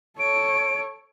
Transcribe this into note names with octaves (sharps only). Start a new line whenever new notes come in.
A4 C#5 D7